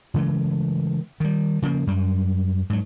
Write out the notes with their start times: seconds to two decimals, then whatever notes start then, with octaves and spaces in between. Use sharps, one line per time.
0.14 C#3 E3 G#3 A3
1.20 D#3 G3
1.62 C#3 F3 F#3 A#3
1.87 F#2 G3
2.70 G#2 F#3